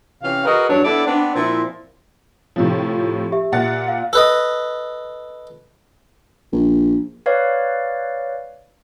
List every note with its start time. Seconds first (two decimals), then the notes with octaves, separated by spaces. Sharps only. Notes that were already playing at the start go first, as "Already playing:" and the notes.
0.23 C3 E3 C#4 F5
0.45 F#4 G#4 A#4 B4 D#5
0.69 E2 G2 F#3 D4 C#5
0.84 B3 D4 E4 A4 D5
1.06 B3 C4 D4
1.35 A#2 F3 C4 E4
2.56 A2 C3 F3
3.32 G4 E5
3.52 A#2 F#5 A6
3.88 F5
4.13 A4 B4 D#5
6.52 A#1
7.26 B4 C#5 D5 F5